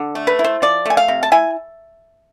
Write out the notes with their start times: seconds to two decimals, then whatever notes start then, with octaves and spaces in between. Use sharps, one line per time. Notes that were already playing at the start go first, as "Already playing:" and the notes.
Already playing: D3
0.15 A3
0.27 B4
0.39 E4
0.44 C5
0.62 F3 D5
0.86 A3 G#5
0.97 F5
1.08 C3
1.23 A5
1.32 E4 G#5